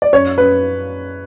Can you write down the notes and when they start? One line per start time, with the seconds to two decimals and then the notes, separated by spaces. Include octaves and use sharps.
0.02 D5
0.12 F#2 C#5
0.38 F#2 B4